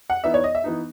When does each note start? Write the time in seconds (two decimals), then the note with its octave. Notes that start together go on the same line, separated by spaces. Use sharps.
0.10 F#5
0.24 E3 B3 D#4 E5
0.34 C#5
0.44 D#5
0.55 E5
0.64 E3 B3 D#4